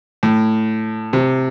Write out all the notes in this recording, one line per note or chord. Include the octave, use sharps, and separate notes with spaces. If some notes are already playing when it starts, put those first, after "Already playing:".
A2
C3